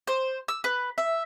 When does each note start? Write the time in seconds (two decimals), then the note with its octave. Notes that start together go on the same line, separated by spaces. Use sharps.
0.07 C5
0.48 E6
0.64 B4
0.98 E5